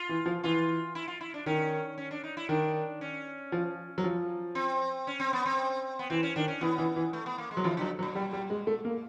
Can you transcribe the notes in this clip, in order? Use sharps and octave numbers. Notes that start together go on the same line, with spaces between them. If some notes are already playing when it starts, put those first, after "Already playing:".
Already playing: F4
E3
F3
E3 F4
E4
F4
E4
D4
D#3 C#4
C#4
D4
D#4
E4
D#3 D4
C#4
F3
F#3
F3
C4
C#4
C4
B3
C4
B3
E3 C4
C#4
D#3 D4
C#4
E3 B3
E3
E3
A3
B3
A#3
G#3
F#3
D#3 F3
D3 F#3
F#3
A#2
G3
G3
G#3
A3
A#3